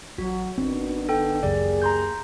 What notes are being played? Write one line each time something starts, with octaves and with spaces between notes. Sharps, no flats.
A1 F#3 F#4
G#1 D#3 B3 C4 D4
A4 G5
C#2 F#2 A#3 G4 G#4 D5
A#5 C6 G6